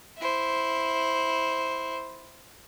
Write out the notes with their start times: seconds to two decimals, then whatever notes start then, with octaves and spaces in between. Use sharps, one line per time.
0.18 E4 C5